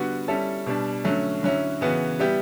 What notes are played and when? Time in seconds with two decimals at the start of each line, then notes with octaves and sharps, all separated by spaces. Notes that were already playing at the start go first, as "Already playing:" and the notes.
Already playing: D3 G3 B3 F#4
0.28 G3 C#4 E4 A4
0.66 B2 G3 D4
1.04 D3 F#3 A3 C#4
1.43 D3 F#3 C#4 E4
1.81 C#3 E3 B3 F#4
2.19 G3 B3 E4 G4